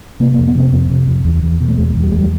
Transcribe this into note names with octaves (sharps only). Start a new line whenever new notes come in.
C3 A#3
A#3
F2
B3
C3 C4
F2
C3
F2
E2
E2
B2
A3
E2 G#3
E2
G3
E2 G#3
G3